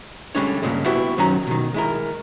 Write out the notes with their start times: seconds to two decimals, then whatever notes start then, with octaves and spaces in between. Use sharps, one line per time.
0.35 D3 G3 G#3 C#4 D#4 C#5
0.62 G2 A#2 C#3 G#3
0.85 B3 E4 F#4 G4 E5 F#5
1.18 F#2 D#3 F#3 C#4 A#5
1.47 B2 D#3
1.74 G#3 E4 A#4